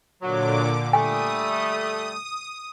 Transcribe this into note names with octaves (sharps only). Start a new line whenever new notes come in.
A#2 D3 F#3 D6
G3 A3 G#5 D#6